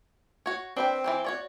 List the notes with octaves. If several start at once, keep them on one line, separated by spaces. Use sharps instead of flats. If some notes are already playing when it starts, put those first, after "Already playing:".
F#4 C#5
C4 D4 B4 G5
E3 A#3 C5
F#4 C#5 D5